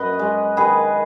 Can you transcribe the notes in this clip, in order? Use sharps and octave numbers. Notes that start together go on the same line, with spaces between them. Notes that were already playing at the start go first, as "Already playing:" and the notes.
Already playing: F#2 B4 D#5
G#3
D#3 G#4 B4